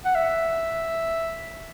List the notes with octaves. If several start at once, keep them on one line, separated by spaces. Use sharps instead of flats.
F#5
E5